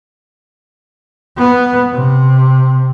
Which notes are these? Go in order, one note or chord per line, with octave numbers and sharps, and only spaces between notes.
B3
C3